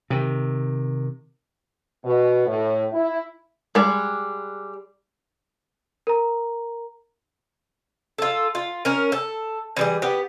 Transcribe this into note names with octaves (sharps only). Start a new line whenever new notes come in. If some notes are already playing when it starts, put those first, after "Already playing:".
C3 D#3
B2
A2
E4
G3 G#3
A#4 A#5
F4 A4
F4
C#4 A#4
A4
E3 G3 G#4
B3 G4